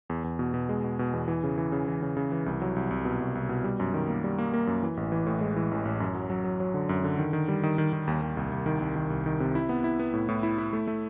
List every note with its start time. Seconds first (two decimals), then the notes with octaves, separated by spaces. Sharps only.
0.10 E2
0.24 E2
0.39 B2
0.54 B2
0.69 G#3
0.84 B2
0.99 B2
1.13 E2
1.28 E3
1.43 C#3
1.58 E3
1.72 C#3
1.88 E3
2.02 C#3
2.17 C#3
2.32 E3
2.46 C2
2.62 F#3
2.76 C2
2.91 C2
3.05 B2
3.21 C2
3.35 C2
3.49 B2
3.64 G3
3.80 F#2
3.94 D#3
4.09 A#3
4.24 G3
4.38 A#3
4.53 A#3
4.67 F#2
4.83 E3
4.97 A1
5.12 E3
5.27 A2
5.41 G#3
5.56 E3
5.71 A1
5.85 A1
6.00 F#2
6.15 F#3
6.30 F#3
6.44 F#3
6.60 F#3
6.74 D3
6.89 F#2
7.04 D3
7.18 D#3
7.33 D#3
7.48 G3
7.63 D#3
7.78 D#3
7.93 D#3
8.07 D#2
8.22 D#2
8.37 C2
8.52 C2
8.66 D#3
8.81 C2
8.96 D#3
9.10 C2
9.26 D#3
9.40 C3
9.55 E4
9.69 B3
9.84 E4
9.99 B3
10.13 A2
10.29 A2
10.43 E4
10.58 E4
10.73 A3
10.87 A3